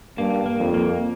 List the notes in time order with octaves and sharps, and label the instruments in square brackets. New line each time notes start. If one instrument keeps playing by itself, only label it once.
[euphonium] G2 [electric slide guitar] A#3
[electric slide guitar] A#3
[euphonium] F2
[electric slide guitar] A#3